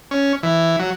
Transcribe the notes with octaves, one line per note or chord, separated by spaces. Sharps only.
C#4
E3
F#3